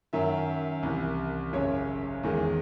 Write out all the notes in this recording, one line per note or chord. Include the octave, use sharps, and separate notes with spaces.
F#2 D#3 F#3 E5
C2 C3 E3
G#1 F#2 C#3 C#5
E2 D#3 G#3